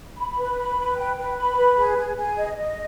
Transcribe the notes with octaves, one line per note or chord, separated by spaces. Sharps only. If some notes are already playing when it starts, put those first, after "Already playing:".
B5
B4
B5
B4
G5
B4
B5
B4
G#4
G#4
G#4
D#5
D#5